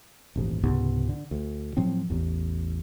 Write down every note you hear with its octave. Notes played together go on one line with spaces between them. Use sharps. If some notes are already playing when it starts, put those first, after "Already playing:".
D#1 A1 G#2
C#2 G#2 C3 B3
D3
D2
A2 F3 F#3 C4
A1 E2